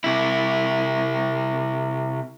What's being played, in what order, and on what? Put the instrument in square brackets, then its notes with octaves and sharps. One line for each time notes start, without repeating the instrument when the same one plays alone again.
[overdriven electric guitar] C3 E4